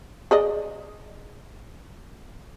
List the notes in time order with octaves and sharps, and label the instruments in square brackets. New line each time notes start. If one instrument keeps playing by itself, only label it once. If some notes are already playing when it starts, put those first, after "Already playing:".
[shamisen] G#4 D5 D#5